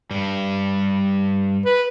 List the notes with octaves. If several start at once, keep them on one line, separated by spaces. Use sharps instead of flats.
G2 G3
B4